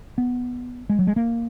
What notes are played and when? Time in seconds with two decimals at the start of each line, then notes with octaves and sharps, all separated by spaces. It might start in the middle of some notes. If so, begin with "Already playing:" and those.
0.18 B3
0.89 G#3
0.99 F#3
1.07 G#3
1.16 A#3